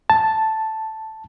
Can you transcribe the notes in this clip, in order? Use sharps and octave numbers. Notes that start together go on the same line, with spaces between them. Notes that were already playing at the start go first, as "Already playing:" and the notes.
A5